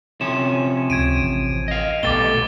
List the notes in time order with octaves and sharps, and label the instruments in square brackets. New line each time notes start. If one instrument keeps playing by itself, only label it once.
[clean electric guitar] C3 F3 C#4 [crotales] E7
[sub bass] C#2 [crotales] G#6 D7 D#7
[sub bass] A1
[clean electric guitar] D#5 F5
[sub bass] A#1 [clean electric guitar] B2 G3 A3 [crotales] D6 A6 G7